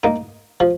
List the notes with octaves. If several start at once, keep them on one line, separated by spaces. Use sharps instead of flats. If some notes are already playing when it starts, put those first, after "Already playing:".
A#3 D#4
F3